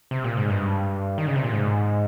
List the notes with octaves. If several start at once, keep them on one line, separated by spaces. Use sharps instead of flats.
C3
A#2
G#2
G2
D#3
C#3
C3
A#2
G#2